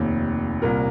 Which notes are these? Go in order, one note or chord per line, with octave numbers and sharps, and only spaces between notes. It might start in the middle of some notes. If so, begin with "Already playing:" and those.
Already playing: F1 D#2 D#3
C2 A#2 A#4